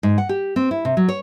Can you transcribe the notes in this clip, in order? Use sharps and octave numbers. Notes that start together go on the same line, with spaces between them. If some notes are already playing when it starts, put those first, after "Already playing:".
G#2
F#5
G4
C4
E4
C3
F#3
C#5